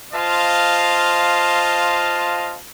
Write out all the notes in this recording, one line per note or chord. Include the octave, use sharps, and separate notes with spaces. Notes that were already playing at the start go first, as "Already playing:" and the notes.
F4 C5 D#5 F5 A5